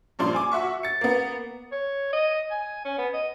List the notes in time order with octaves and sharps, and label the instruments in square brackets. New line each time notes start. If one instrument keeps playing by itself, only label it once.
[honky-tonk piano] G2 A#2 F3 D4 C6
G#5 D6
F#4 E5 C#6
A6 C#7
A#3 B3
[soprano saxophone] C#5
D#5
G#5
C#4
B3
D#5